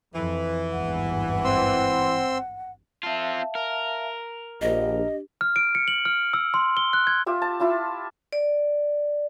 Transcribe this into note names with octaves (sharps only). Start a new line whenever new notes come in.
F2 E3
G#1 E2 G2 F#5
C4 C6 E6
C4 F4 E5 F5 A5
A#4
A#1 D4 G4 D#5
F6
D7
C#7
F#7
F6
E6
C6
G7
F#6
G#6
F4 G4 E5
A5
E4 F4 A5
D5